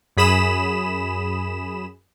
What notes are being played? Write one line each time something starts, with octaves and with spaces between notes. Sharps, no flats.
F#2 G#4 B5 D#6 E7